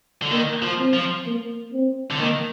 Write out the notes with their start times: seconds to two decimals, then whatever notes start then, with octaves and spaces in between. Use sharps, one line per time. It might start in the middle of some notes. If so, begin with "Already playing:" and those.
0.22 D3
0.31 D#3 A#3
0.62 F3
0.79 C4
0.94 F3
1.26 A#3
1.73 C4
2.11 D3
2.20 D#3 A#3